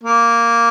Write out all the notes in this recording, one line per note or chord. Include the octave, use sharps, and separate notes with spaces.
A#3